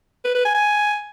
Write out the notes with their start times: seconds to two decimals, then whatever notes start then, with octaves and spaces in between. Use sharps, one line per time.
0.25 B4
0.35 B4
0.45 G#5
0.55 G#5